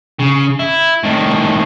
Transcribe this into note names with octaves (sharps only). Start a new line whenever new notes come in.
C#3
E4
A2 D#3